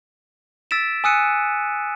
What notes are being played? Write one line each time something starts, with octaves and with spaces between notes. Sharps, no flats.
E6 A6 B6 D7 E7
G#5 D#6 E6 F#6 C#7 D#7